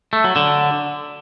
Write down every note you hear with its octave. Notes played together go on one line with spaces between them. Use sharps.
A3
F#3
D3